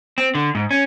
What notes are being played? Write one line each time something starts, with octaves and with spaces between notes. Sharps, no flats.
C4
D3
G#2
C#4